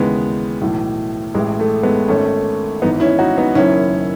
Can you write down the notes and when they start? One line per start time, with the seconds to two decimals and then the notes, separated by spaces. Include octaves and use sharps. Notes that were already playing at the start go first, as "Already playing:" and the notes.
Already playing: D#2 C#3 E3 G#3 B3
0.61 B1 A2 E3
1.34 A1 A2 E3 G#3
1.60 A3
1.83 G#3 B3
2.08 G#1 G#2 D#3 A3 C#4
2.82 G#1 G#2 E3 B3 D#4
3.00 C#4 E4
3.19 D#4 F#4
3.38 B3 D#4
3.55 F#1 F#2 D#3 C#4 E4